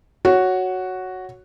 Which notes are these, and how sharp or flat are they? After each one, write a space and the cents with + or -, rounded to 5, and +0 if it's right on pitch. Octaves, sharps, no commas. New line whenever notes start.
F#4 +0 C#5 +0